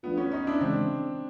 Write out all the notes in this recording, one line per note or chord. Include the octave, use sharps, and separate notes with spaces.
F3 A3 B3 D4 F4
B3 C#4
C#4 D#4
D4 E4
C#3 E3 G#3 C4 D4